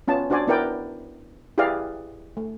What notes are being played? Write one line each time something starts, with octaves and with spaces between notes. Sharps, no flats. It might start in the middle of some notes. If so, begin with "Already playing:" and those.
B3 C#4 F4 A5
D4 F#4 C5 D5 G#5
B3 E4 A#4 D5 G5
E4 G4 G#4 B4 D5 F5
A3